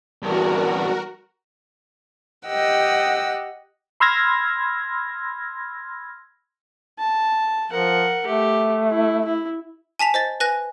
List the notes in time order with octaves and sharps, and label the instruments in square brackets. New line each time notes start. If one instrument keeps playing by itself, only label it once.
[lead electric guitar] E2 G2 [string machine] F#4 A#4
[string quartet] G4 D#5 F#5 G5 E6
[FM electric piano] B5 C6 E6 F6 G#6 A#6
[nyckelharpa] A5
[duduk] F3 [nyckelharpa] A#4 F#5
[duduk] A3 [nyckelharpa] G4
[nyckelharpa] E4
E4
[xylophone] G#5 A5 B6 F7
C5 D#5 A6
B4 G#5 F#6 A#6